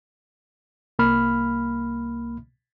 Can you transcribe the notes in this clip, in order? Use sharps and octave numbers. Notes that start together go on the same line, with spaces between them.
C2 A#3 B5 F6